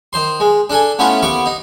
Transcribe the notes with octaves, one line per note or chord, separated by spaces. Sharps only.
D#3 C5 C6
G#3
D4 A4 G#5
A3 B3 C#4 E4 F4
D#2 B3 C#6 D6
D#4